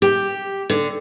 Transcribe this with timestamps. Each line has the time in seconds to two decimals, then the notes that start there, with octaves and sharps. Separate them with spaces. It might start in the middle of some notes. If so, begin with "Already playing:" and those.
0.02 G4
0.70 D3